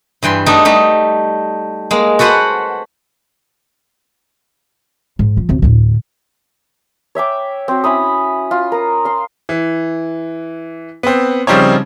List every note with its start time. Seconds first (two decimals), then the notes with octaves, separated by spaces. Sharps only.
0.23 G2 E3 G5 C6
0.46 G3 A3 D4 D#4
0.65 G3 A3 D#4
1.91 G#3 A#3
2.19 F#4 A4 B4 C5 F#5
5.19 G#2
5.37 F3
5.49 D2 C3
5.62 D2 A2
7.15 C#5 E5 G5 D6
7.68 C4 F#4
7.84 C#4 E4 B5 D#6
8.51 F4
8.72 A#4 D#6
9.05 F5 C6
9.49 E3
11.03 B3 C4
11.47 C#3 F3 G3 C4 D#4 C#5